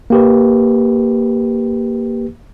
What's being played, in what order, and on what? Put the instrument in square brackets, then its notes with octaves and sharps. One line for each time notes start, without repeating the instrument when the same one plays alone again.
[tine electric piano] A#3 G4 B4